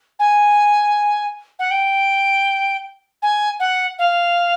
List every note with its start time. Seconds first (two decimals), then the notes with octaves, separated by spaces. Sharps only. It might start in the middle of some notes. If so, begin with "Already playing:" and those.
0.19 G#5
1.59 F#5
1.71 G5
3.22 G#5
3.60 F#5
3.99 F5